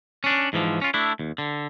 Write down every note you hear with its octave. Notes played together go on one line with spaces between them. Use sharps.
C#4 D4
G#2 E3 F3
C#4 F4
A3 D4 E4
D#2
D3